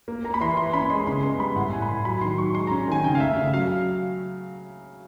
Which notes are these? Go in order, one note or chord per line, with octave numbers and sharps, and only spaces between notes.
A#3
A#3 A#5
B5
E3 C6
E3 C6
C#4 B5
G#3 C6
C#3 C6
B3 C6
G3 B5
A2 F#5
A2 G#5
B5
A2 C6
F#3 B5
D#3 C6
F#3 C#6
G#3 C6
A#5
C#4
D#3 G#5
C#3 G5
F5
A3 E5
C#3 F5
F#3 F5